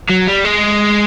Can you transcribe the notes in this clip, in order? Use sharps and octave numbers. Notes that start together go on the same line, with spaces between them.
F#3
G3
G#3